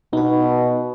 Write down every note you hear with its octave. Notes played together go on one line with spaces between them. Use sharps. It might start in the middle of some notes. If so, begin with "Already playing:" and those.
B2 D#4 B4